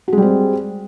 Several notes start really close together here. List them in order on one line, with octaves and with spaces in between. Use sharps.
F#4 G#3 G3 C4